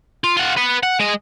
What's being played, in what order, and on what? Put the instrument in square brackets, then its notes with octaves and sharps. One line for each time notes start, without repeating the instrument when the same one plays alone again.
[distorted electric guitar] F4
F4 F#5
B4 F#5
F#5
G#3 D#5